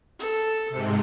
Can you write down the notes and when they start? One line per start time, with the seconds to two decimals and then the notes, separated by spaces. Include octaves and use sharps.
0.19 A4
0.70 G#2 C3